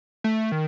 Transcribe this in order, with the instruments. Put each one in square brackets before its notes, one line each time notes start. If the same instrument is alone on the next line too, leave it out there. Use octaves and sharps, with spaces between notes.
[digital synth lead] A3
D#3